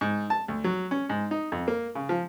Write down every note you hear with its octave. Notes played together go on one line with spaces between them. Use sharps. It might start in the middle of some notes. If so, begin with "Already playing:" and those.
G#2
A5
D2
F#3
C#4
G#2
D#4
F2
A#3
C#3
F3